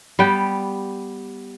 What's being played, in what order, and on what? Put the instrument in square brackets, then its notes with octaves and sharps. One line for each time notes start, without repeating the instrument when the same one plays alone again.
[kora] G3 B3 G4 G5